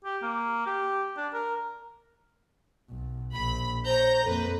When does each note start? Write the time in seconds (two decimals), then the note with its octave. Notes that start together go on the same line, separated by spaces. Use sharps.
0.04 G4
0.22 A#3
0.66 G4
1.17 D4
1.33 A#4
2.90 B1
3.34 A#1 B5
3.86 C5 C#5 A#5 G6
4.25 F2 A#3 A4 B4